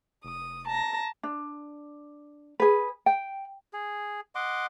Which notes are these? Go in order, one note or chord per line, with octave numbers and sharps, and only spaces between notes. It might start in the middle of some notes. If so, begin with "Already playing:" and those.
F1 D#6
A5 A#5 A#6
D4
G#4 B4
G5
G#4
D#5 F#5 C6 D6